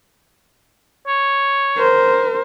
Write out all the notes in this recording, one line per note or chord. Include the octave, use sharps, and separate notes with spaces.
C#5
A#4 C5